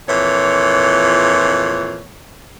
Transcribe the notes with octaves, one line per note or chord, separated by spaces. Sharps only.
F2 A#2 E3 C#5